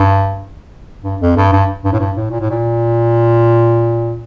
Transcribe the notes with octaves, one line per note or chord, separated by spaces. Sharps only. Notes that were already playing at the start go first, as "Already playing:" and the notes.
Already playing: G2
G2
F2
G2
G2
G2
A2
G2
A2
A#2
A2
A#2